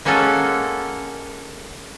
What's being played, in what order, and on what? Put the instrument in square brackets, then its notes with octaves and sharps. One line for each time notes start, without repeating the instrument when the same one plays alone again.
[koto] G#3 A#3 C#4 F#4 A4